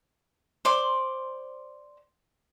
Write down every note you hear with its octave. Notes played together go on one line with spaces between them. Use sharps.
C5 D5 C6 D6